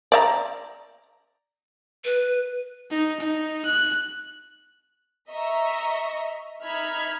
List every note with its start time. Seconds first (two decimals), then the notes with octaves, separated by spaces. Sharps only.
0.12 D5 E5 A#5
2.05 B4
2.91 D#4
3.20 D#4
3.65 F#6
5.30 D#5 E5 A#5 C#6
6.62 D#4 E5 B5 F6 G#6